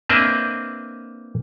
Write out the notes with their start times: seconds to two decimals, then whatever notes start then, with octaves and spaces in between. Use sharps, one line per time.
0.09 A#3 C4 D4 B4 D#5 E5